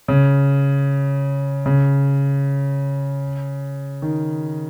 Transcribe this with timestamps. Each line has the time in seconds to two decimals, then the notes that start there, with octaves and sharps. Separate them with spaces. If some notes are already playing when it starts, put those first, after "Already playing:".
0.08 C#3
1.66 C#3
4.02 D#3